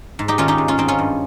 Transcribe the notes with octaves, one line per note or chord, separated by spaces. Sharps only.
G#2
D#4 G4
D#3 C#4 F4
D#4 G4
G#2
C#4 F4
D#3 C4 D#4
C#4 F4
G2